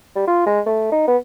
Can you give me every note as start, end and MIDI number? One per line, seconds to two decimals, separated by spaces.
0.16 0.26 55
0.28 0.41 65
0.46 0.60 56
0.66 0.88 57
0.92 1.05 63
1.08 1.17 59